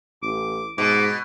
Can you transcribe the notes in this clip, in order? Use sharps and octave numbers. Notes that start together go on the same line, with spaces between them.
A1 D6
G#2 B2 D6